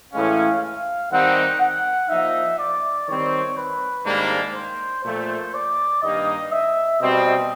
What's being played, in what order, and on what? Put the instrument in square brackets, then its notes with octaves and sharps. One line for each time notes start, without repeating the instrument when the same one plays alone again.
[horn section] A2 E3 G#3 C#4 [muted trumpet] F5
[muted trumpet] F5
[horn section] D#3 G3 C4 D#4 G4 [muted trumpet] F#5
[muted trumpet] F#5
[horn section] F3 A#3 D#4 [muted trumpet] E5
[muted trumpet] D5
[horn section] D#3 G3 C4 [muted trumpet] C#5
[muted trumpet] B4
[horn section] G#2 D#3 G3 A#3 D4
[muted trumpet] C5
[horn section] A#2 F3 A3 [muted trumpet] C5
[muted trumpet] D5
[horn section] G2 D#3 G3 A#3 D#4 [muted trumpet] D#5
[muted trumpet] E5
[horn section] B2 G3 C4 [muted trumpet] D#5